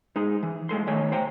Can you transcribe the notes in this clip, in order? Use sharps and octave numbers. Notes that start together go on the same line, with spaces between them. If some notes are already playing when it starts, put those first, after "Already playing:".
G#3 D#4 G#4
E3
A2 G#3 A4 C6
D#3 A3 C#5 G#5
C5 G5 A#5